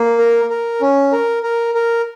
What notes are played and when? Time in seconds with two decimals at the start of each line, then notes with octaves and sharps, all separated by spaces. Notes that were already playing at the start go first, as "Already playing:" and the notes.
Already playing: A#3
0.18 A#4
0.50 A#4
0.81 C#4
1.12 A#4
1.43 A#4
1.75 A#4